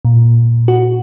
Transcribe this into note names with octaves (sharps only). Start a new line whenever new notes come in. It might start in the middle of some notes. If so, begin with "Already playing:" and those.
A#2
F#4